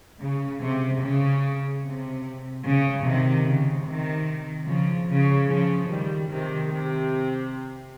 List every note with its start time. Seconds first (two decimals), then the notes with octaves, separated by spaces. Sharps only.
0.21 C#3
0.62 C3
1.02 C#3
1.83 C3
2.65 C#3
3.05 C3 D#3
3.46 C#3
3.86 C3 D#3
4.67 C#3 F3
5.07 C#3
5.48 C#3 F3
5.89 D#3 G3
6.29 C3 D#3
6.70 C3